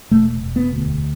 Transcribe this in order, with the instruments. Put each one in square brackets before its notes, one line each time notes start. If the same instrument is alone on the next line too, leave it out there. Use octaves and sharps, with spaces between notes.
[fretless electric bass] E1 A3
E1
B3
D2